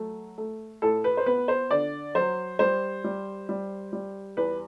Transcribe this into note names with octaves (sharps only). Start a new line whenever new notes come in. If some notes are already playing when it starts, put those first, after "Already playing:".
Already playing: F#3 A3
A3
A2 A4
B4
C5
B3 B4
C5
D3 D5
F#3 C5
G3 C5
G3
G3
G3
E2 B4